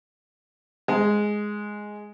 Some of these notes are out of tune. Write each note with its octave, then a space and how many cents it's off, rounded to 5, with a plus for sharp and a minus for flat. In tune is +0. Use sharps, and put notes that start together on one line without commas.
G#3 +5